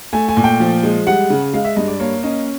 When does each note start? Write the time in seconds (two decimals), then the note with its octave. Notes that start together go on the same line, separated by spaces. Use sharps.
0.13 A3 G#5
0.29 G#5
0.37 A#2
0.44 G5
0.60 F3
0.83 G#3
1.07 G3 F#5
1.30 C#3
1.54 G#3 F5
1.65 E5
1.76 G2 D#5
1.88 D5
2.00 A#3 C#5
2.23 C#4 D#5